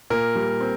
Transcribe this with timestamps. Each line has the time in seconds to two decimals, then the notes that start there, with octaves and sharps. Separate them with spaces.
0.10 A#2 A#4
0.36 G3
0.61 C4